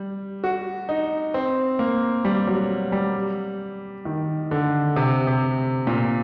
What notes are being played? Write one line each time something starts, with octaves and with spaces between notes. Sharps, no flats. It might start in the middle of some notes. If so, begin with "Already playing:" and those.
Already playing: G3
F#4
D#4
C4
A#3
G3
F#3
G3
D#3
D3
C3
C3
A#2